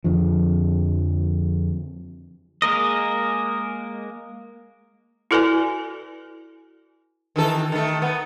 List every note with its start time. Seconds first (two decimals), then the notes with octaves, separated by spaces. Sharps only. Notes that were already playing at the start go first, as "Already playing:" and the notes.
0.04 F2 D3 F3
2.62 G#3 A#3 A#4 D#5
5.31 E4 F#4 A4 B4 D5 G#5
7.36 D#3 E3 A4
7.72 D#3 A3
8.02 B3